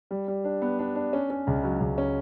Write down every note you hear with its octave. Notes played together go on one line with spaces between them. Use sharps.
G3
G3
D4
B3
D4
D4
C#4
C#4
C#2
F#3
C#2
C#4